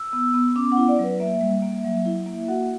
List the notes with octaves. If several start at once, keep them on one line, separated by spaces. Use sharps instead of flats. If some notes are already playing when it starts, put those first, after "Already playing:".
Already playing: E6
B3
B3
C#4 D6
F#5
E4
D5
F#3 B4
A#3 E5
G3
A#3
F#3
E4
A#3
F#4 F#5